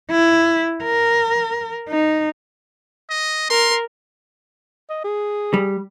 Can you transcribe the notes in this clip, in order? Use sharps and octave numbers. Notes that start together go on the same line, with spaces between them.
E4
A#4
D#4
D#5
A#4 C6
D#5
G#4
G3